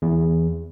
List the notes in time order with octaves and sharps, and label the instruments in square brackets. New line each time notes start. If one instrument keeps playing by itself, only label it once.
[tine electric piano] E2